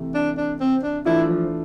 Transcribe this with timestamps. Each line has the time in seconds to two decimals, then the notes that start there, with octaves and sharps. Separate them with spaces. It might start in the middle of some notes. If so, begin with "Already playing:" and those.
Already playing: C3 E3 A3
0.14 D4
0.37 D4
0.60 C4
0.83 D4
1.05 E3 A3 D4 E4 F4
1.28 F3